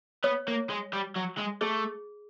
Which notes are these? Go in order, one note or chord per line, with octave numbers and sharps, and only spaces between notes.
B3 C#5
A#3
G#3
G3
F#3
G#3
A3 G#4